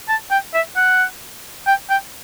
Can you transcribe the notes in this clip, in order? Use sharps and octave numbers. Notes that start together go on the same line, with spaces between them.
A5
G5
E5
F#5
G5
G5